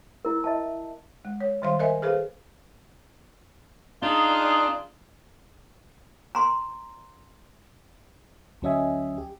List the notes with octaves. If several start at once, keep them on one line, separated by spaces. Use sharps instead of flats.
E4 A#4
D#5 E5 A5
G#3
C#5
D#3 G3 C5 F5 C6
A#4 C5 D#5 E5 G#5
G#4 A4 B4 C5 F5
D4 D#4 F4 G#4
A#5 C6
D2 F#3 C#4 D#5 E5 G#5
G4